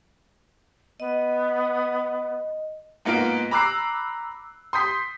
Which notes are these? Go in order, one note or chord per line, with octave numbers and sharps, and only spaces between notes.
B3 D#5
G#2 A#3 B3 F4 D7
A#5 B5 D6 E6 F#6 C7
C6 D#6 G6 B6